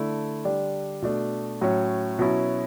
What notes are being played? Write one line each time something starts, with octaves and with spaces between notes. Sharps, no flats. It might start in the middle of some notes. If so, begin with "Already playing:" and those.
Already playing: D3 A3 E4
D3 G3 D4
B2 A3 D4
A2 F#3 C#4
B2 F#3 C#4 E4